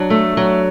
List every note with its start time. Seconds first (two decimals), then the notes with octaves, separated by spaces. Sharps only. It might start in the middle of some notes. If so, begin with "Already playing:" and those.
Already playing: F#3 D4
0.10 A3
0.37 F#3